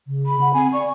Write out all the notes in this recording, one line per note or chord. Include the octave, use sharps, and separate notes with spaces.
C#3
B5
F#5
C4 G#5
D5 C#6